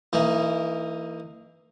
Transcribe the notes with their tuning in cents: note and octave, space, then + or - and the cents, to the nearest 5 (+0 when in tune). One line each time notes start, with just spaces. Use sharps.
E3 +0 A#3 -35 D#4 +0